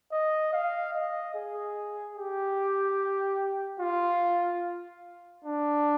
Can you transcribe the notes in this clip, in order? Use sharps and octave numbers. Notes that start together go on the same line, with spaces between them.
D#5
F5
D#5
G#4
G4
F4
D4